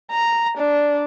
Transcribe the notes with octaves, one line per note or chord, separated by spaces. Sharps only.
A#5
D4